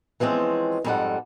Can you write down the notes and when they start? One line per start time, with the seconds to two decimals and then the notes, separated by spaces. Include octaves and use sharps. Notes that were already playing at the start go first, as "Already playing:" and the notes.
0.20 E3 F3 G#3 C4 C#4
0.84 F2 G#2 G3 F4 A4 F#5